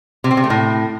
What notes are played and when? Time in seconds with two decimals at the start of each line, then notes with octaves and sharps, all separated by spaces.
0.24 C3
0.31 C4
0.37 C3
0.44 A3
0.50 A2